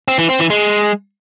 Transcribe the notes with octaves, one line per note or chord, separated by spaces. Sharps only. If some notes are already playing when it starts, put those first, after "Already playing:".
C4
E3
C4
E3
G#3